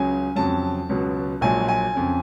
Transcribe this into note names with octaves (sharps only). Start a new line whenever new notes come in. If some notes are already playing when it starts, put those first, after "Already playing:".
Already playing: C#2 C#3 F#3 G#5
F2 C#3 F#3 A5
C#2 B2 F#3
A#1 A#2 F#3 G#5
G#5
F2 C#3